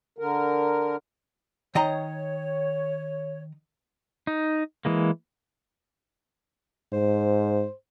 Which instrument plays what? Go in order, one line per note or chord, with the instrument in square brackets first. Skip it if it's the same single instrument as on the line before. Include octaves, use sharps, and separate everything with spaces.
[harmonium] D3 A#4
[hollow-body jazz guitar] D#3 D#5 A#5 [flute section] C#5
[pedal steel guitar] D#4
E3 G#3 A#3
[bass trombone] G#2 [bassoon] C5